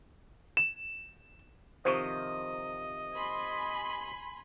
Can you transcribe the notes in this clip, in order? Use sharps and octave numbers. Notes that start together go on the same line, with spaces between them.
E7
C3 D#3 F3 C5 D#5 C#6
G#5 B5 C6